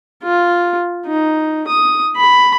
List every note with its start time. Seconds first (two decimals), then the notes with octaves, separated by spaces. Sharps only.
0.24 F4
1.06 D#4
1.68 D#6
2.16 B5